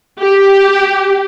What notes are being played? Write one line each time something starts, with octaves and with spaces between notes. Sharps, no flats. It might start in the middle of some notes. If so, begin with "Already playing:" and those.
G4